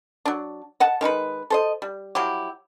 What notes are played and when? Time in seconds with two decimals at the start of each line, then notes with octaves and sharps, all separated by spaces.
0.25 F#3 D4
0.80 D#5 F#5 A5
1.01 D#3 G#3 D#4 B4
1.50 A4 C5 D#5
1.82 G3
2.15 F3 F#3 E4 G4